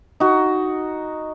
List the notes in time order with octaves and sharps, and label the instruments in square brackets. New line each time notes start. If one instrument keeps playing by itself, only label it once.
[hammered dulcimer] D#4 F#4